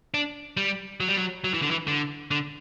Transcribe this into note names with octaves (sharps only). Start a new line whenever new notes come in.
D4
G3
F#3
G3
F#3
F#3
E3
D3
E3
D3
D3